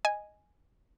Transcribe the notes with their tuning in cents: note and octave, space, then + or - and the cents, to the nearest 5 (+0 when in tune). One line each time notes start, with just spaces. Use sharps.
D#5 +0 G#5 +0